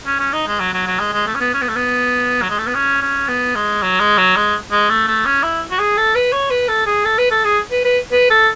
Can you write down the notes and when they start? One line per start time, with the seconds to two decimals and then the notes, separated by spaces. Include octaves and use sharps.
0.06 C#4
0.19 C#4
0.33 D#4
0.47 G#3
0.60 F#3
0.73 F#3
0.87 F#3
1.00 G#3
1.13 G#3
1.27 A3
1.35 C#4
1.40 B3
1.54 C#4
1.62 B3
1.69 A3
1.76 B3
2.42 F#3
2.50 G#3
2.58 A3
2.67 B3
2.75 C#4
3.02 C#4
3.28 B3
3.55 G#3
3.83 F#3
4.00 G#3
4.18 F#3
4.36 G#3
4.72 G#3
4.89 A3
5.08 A3
5.26 C#4
5.43 E4
5.71 F#4
5.79 G#4
5.97 A4
6.15 B4
6.33 C#5
6.51 B4
6.68 A4
6.86 G#4
7.05 A4
7.18 B4
7.31 A4
7.44 G#4
7.71 B4
7.85 B4
8.12 B4
8.30 A4